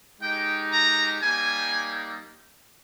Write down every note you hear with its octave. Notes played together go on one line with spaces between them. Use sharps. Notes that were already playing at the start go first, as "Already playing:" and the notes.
G#3 D#4 G4 G5
A#5
G3 A#3 D#4 G#5